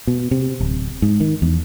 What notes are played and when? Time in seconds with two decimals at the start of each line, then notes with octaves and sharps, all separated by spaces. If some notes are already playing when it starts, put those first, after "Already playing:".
0.07 B2
0.31 C3
0.60 D1
1.02 G#2
1.20 D#3
1.42 E2